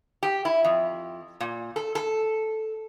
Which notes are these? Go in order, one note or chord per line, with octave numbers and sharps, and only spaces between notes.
G4
E4
F2
A#2
A4
A4